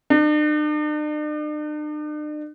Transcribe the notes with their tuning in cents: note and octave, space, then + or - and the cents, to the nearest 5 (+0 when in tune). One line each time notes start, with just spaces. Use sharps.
D4 +45